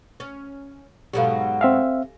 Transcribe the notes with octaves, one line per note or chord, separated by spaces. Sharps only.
C#4
G#2 B2 F#3 G4 A4 F5
C4 E5 F5 G#5